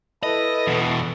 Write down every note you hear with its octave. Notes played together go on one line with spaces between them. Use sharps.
E4 A4 B4 D#5
E2 B2